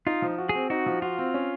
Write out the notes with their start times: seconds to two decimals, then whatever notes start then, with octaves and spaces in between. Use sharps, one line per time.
0.07 D#4 F4
0.22 F3
0.38 F#4
0.49 G#4
0.55 C4
0.70 D#4 F#4
0.86 F3
1.02 F4 F#4
1.18 C4
1.34 C#4